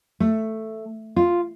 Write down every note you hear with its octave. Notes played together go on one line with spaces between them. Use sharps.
A3
F4